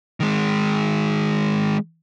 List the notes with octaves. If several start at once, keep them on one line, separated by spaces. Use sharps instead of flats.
D#3 G#3